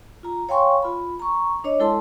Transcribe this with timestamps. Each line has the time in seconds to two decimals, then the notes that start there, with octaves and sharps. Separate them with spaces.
0.23 F4 A#5
0.49 C#5 F5 G5 G#5 C6 C#6
0.83 F4 B5
1.20 A#5 C#6
1.64 D4 C#5 D#5
1.80 G#3 E4 A4 A5 C6